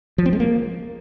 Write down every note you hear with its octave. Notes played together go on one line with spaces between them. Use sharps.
F3
C4
G#3
A#3